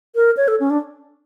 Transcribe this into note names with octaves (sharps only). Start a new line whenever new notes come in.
A#4
C#5
A4
C#4
D4